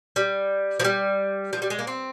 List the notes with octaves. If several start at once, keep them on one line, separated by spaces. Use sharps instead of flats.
G3
F3
G3
F3
G3
G#3
A#3
C4